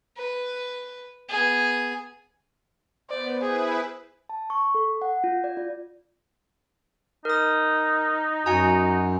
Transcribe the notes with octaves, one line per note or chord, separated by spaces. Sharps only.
B4
B3 G#4
B3 C5 D5
E4 G#4 B4
A5
C#6
A4
F#5
F4
D5
F4
D#4 A#4 D#6
F#2 F#4 F#5 G#5 A#5